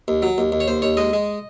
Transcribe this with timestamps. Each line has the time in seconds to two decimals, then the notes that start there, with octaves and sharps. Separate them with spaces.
0.08 D#2
0.22 F#3
0.38 D#2
0.52 D#2
0.60 C#5
0.68 D#2 C5
0.82 D#2 C#5
0.97 G#3 D#5
1.13 G#3